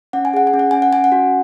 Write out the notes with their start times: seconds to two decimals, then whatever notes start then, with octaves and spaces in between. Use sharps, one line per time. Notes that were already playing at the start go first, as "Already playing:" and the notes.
0.13 C#4 F#5
0.25 G#5
0.34 G#4 F#5
0.47 G#5
0.54 C#4
0.59 F#5
0.71 C#4 G#5
0.82 F#5
0.92 C#4 G#5
1.04 F#5
1.12 F#4